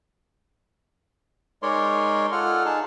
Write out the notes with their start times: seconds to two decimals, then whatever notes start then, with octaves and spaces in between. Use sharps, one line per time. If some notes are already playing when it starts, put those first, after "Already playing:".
1.63 G#3 D#4 A#4 C#5 D5 C6
2.32 F4 A4 F#5 F6
2.65 D#4 G#4 A5